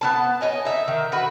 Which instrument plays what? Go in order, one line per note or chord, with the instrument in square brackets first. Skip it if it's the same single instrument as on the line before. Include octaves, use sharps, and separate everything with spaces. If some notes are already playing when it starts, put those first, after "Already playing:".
[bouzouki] B3 C#4 A5
C#5 D#5 G#5
D#4 E5
D#3
F#4 B4